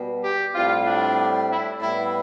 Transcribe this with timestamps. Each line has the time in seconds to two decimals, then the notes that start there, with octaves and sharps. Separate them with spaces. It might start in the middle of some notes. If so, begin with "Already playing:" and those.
Already playing: B2 G3 B3
0.22 G4
0.54 A2 G3 C4 F4
0.85 D4
1.49 E4
1.80 A2 G3 B3 E4